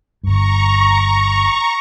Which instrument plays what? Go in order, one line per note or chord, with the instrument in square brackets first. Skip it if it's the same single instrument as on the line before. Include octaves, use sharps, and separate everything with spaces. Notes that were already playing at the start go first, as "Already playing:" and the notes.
[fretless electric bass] G1 G2 [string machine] A#5 C#6